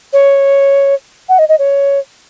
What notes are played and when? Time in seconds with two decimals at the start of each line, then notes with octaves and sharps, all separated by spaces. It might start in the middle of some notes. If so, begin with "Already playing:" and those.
0.13 C#5
1.29 F#5
1.39 D#5
1.49 D#5
1.59 C#5